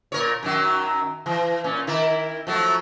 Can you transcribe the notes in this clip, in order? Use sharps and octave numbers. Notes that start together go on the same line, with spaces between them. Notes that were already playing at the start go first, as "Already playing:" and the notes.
A#2 A#4 C#5
F#2 D#3 F#3
E3
A#2 C#4
D#3 E4 A#4
F3 F#3 A3